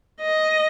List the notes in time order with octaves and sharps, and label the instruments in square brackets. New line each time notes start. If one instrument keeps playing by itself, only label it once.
[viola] D#5